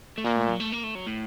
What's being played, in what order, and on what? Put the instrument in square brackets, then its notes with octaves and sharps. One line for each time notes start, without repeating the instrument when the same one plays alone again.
[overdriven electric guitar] A3
[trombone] A#2 [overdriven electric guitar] A#3
[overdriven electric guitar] A3
F#3
A3
A#3
A3
F#3
A2